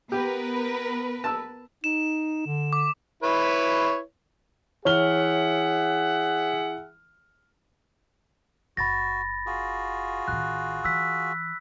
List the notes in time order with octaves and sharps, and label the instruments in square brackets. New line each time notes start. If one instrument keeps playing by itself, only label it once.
[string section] B3 A#4 B4 [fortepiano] G4
[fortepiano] A5 E6
[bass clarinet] D#4 [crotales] E7
[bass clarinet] D3
[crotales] D6
[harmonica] E4 B4 C#5
[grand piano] E3 F6 G7 [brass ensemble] G#4 E5 F#5 [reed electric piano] C#5
[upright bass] F#1 [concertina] F#4 [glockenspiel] B5 A6 A#6
[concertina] F4 F#4 G#4
[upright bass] A1 D#3 [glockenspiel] F#6
[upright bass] E3 [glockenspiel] E6 F#6 B6